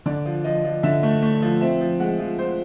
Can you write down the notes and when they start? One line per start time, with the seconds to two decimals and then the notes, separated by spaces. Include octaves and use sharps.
0.06 D3 D5
0.25 F3
0.44 F3 D#5
0.64 F3
0.83 D3 E5
1.03 A3
1.23 A3
1.42 F3
1.61 C4 E5
1.81 F3
2.00 G#3 F#5
2.19 F3
2.39 F3 C5